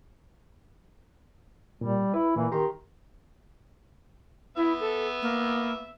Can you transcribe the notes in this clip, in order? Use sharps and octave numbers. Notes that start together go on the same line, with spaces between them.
A#2 G3
E4 B4
A#2 E3 A#3
D#3 G4 A#5 C6
B3 E4 E5
A4
A#3